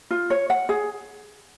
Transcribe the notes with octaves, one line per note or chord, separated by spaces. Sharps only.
F4
C#5
F#5
G#4